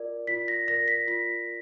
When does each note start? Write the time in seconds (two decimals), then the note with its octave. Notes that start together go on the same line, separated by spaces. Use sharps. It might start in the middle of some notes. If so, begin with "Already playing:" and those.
Already playing: F4 A#4 D5
0.27 F4 B6
0.48 A#6
0.67 A#4 D5 A#6
0.88 B6
1.07 F4 B6
1.47 A#4